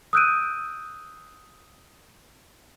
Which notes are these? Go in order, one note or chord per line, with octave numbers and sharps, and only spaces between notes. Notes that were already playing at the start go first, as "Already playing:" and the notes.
D#6 E6 F#6 G6 D7 D#7